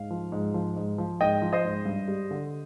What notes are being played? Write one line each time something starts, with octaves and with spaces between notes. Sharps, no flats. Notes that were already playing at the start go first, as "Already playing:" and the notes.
Already playing: G#2 F5
F3
G#2
F3
G#2
F3
G#2 D#5 G5
F3
C5 D#5
G#2
G2
G3
D3